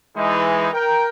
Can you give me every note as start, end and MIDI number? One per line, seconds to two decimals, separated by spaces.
0.15 0.68 52
0.15 0.68 56
0.15 0.68 63
0.73 1.09 70
0.73 1.09 79